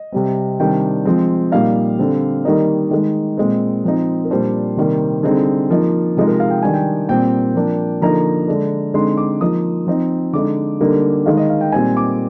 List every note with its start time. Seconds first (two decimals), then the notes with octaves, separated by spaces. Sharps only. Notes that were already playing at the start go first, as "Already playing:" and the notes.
Already playing: D#5
0.12 C3 G3 C4
0.60 C3 D#3 G3 D4 G5
1.05 F3 G#3 C4
1.52 A#2 G3 A#3 D#4 F5
1.99 D3 G3 C4
2.45 D#3 G3 A#3 D#4 D#5
2.91 D#3 G#3 D#4
3.37 A#2 G#3 C4
3.84 F3 C4 D#4
4.25 A#4
4.30 A#2 G3 D4 C5
4.77 C3 D#3 G3 A#3
5.23 D3 G3 C4 D#4 G#4
5.70 F3 A#3 D#4
6.17 C3 F3 G#3 D#4
6.27 A#4
6.40 F5
6.50 G5
6.63 D#3 G3 D4 G#5
6.74 G5
7.09 A#2 G3 C4 G5
7.55 F3 A#3 D4
8.02 D3 F3 A#3 D#4 A#5
8.48 D3 G#3 D4
8.94 D3 G#3 C4 D#4 C6
9.17 D6
9.41 F3 A#3 D#4 D#6
9.87 F3 C4 D#4
10.33 D3 G#3 D#4 D6
10.80 D3 G3 A#3 D#4
11.26 D#3 G#3 D#4 F5
11.37 D#5
11.50 F5
11.61 G5
11.72 A#2 G3 C4 D#4 G#5
11.97 D6